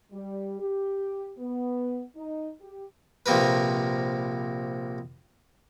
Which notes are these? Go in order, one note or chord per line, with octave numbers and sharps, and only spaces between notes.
G3
G4
B3
D#4
G4
A#1 C3 A#3 A#4 B4